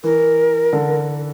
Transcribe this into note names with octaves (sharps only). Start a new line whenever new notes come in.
E3 A#4
D3